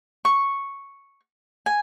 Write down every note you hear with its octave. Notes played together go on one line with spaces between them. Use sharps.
C#6
G#5